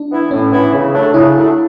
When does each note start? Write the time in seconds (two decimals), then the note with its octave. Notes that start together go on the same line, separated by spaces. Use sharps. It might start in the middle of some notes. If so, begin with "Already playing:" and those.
Already playing: D4
0.11 E3 B3 E4
0.31 A2 C#4
0.52 E3 B3 E4
0.73 C#3
0.93 F#3 A3 D4
1.13 C#3 E4
1.35 F#3 A3 D4